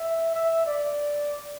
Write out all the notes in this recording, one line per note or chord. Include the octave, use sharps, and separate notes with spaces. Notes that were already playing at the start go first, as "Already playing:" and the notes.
Already playing: E5
E5
D5